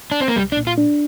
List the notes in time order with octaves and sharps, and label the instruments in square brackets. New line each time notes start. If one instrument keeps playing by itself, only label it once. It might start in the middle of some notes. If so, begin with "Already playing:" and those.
[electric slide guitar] D4
C4
A#3
[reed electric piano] C2 [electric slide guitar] G3
[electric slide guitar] D4
[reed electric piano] A#2
[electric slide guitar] F4
[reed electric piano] D4